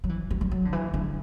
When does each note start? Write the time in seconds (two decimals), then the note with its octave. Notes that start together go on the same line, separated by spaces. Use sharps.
0.04 F#3
0.09 E3
0.31 F#3
0.41 F#3
0.51 F#3
0.65 D3
0.73 E3
0.94 D3